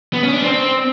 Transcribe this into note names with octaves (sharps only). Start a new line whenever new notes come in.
B3
C#4
D4
C4